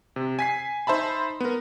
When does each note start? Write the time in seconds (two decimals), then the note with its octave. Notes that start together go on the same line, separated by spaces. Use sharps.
0.16 C3
0.39 G#5 B6 C7
0.87 D#4 C5 E5 A5 B5
1.40 B3 A#4